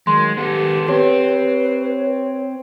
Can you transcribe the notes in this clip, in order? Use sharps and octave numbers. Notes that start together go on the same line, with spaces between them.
D#3 F#3 G#3 C6
B3 G4 A4
C4 G4 B4 C#5